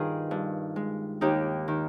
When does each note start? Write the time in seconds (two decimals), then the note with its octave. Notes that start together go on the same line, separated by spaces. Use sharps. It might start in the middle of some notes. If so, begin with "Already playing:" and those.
Already playing: G2 D#3 F4 G#4 B4
0.31 G2
0.76 G#3
1.21 D#2 D#4 G4
1.68 D#3